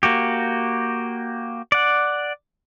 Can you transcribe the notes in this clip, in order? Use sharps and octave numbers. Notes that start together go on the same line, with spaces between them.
A#3 F#4 G4
D5 F#5